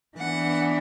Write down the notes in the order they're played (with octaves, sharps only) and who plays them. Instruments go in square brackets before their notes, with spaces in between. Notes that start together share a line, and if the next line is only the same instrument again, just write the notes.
[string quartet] E3 B3 D4 F#5